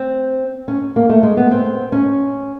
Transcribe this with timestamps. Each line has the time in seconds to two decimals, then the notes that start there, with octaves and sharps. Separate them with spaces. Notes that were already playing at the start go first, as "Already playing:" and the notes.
Already playing: C4
0.68 C#4
0.96 A#3
1.09 A3
1.23 G#3
1.37 B3
1.51 C4
1.92 C#4